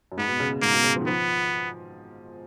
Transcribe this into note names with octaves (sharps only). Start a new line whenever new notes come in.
F#2
G#2 B3
B2
C#3
B2
G#2 A#3
B2
C#3
F3
D#3
F3 B3